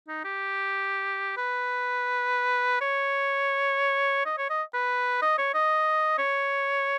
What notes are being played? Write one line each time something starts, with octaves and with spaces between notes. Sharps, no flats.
D#4
G4
B4
C#5
D#5
C#5
D#5
B4
D#5
C#5
D#5
C#5